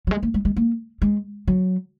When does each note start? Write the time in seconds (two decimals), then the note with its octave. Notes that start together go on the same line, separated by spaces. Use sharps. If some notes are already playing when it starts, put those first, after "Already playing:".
0.07 F#3
0.11 G#3
0.23 A#3
0.34 G#3
0.45 G#3
0.57 A#3
1.02 G#3
1.48 F#3